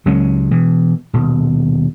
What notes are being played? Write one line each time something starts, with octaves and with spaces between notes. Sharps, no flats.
C#2 F#3 G#3 C#4
B2 E3
D#1 B2